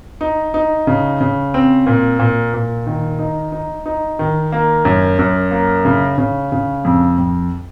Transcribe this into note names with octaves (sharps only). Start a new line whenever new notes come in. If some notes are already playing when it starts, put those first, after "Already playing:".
D#4
D#4
C#3
C#3
C4
A#2
A#2
A#2
D#3
D#4
D#4
D#4
D#3
A#3
F#2
F#2
A#3
C#3
C#3
C#3
F2
F2